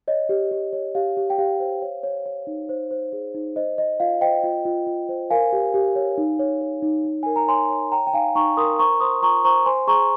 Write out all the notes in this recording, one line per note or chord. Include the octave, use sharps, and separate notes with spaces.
C#5 D#5
G4
G4
C#5
G4 F5
G4
G5
G4 F5
C5
C#5
C#5
C#5
D#4
C5
C5
G#4
D#4
C5 D#5
C5 D#5
F4 F5
C5 D#5 G5
F4
F4
F4
C5
A#4 F5 G#5
G4
G4
C#5
D#4
C#5
C#5
D#4
D#4
A#4 G#5
A#5
C#5 G#5 C6
C#5
C#5 G5 A#5
G5
D#4 F5 G#5
D#4 A#5 C#6
A#4 C6 D#6
C5 A#5 C#6
C5 C6 D#6
F4 A#5 C#6
C5 A#5 C#6
C5 G#5 C6
G#4 A#5 C#6